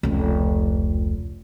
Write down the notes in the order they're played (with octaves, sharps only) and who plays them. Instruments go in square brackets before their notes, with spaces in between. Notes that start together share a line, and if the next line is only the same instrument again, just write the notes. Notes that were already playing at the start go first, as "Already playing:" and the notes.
[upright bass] F1 C#2